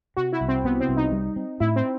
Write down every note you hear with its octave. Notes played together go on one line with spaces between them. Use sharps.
C3 F#4
E4
C2
C4
C3 B3
C4
C2
D#4
G3
C4
A2 E4
C4